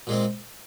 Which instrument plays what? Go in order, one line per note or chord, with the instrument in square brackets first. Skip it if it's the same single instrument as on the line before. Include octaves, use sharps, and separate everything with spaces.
[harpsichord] A#2 G#3 C4